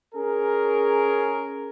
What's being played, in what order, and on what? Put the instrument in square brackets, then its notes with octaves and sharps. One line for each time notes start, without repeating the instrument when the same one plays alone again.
[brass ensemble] C#4 G#4 A#4